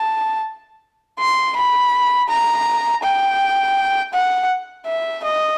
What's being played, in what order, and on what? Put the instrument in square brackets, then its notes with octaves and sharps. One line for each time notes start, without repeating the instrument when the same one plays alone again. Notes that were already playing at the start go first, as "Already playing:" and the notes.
Already playing: [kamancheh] A5
C6
B5
A#5
G5
F#5
E5
D#5